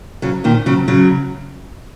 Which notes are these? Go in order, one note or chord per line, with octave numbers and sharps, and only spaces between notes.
C#3 F#3
A#2 D#3
C#3 F#3
C#3 F#3